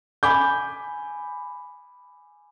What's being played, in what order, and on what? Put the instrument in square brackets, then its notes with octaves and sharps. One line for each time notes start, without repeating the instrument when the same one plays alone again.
[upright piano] G#5 B5 D6 G6